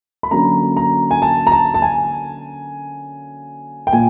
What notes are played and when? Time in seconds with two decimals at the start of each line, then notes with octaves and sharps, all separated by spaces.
0.23 B5
0.31 D3 F#3 A#3 C#4 A#5
0.77 A#5
1.11 G#5
1.22 A5
1.47 A#5
1.52 A5
1.74 A5
1.82 G#5
3.87 G5
3.93 A#2 G#5